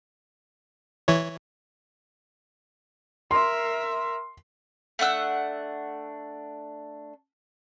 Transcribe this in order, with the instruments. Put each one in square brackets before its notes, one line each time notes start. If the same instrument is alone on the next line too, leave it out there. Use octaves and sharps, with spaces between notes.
[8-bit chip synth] E3 E4 C#5
[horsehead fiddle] A#4 E5 [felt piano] C6
[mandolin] A3 D4 F#5 E6